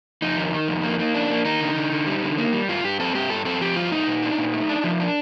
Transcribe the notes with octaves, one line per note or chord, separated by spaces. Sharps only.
F2 D#4
D#3
D#3
F2
A#3
A#3
D4
A#3
A#3 D#4
D3
D3
D3
G3
D3
A#3
G3
G2 F4
G2 G4
C4 A4
G2 G4
G2 A4
C4 A4
F3 G4
G2 F4
A3 D#4
A#2
D4
A#2
A3
D4
F3
D4